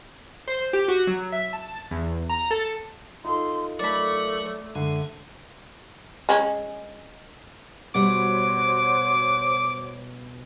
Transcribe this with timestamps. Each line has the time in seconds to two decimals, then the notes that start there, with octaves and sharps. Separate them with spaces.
0.48 C5
0.73 G4
0.88 F#4
1.07 F#3
1.32 E5
1.53 A5
1.91 E2
2.30 A#5
2.51 A4
3.25 D#4 F4 A4 C6
3.79 F#3 A3 A#4 C#5 D5 B5
4.75 F#2 D3 G#3 E5
6.29 G#3 C#4
7.95 B2 G3 F#4 C5 C#5 F#5 D6